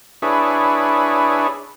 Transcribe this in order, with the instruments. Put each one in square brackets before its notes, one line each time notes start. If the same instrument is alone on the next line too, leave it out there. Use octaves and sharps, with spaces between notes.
[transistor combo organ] D4 E4 G#4 B4 C#5